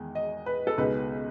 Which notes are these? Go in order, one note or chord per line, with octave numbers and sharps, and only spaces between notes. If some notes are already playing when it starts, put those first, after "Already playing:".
Already playing: E2 D#3 G#3
D#5
B4
A4
C#2 B2 G#3 D#4 B4